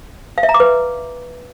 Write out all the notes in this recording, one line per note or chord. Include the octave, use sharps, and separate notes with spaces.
F5
E5
A#5
D6
B4